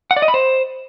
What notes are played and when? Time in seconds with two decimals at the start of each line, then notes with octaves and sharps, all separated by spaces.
0.11 F#5
0.16 D5
0.22 D#5
0.28 B5
0.34 C5